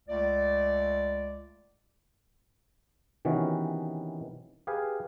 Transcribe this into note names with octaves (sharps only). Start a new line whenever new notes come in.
C#2 A3 D5
C3 D#3 E3 B3 C#4 F#4
G4 G#4 B4 F5 G#5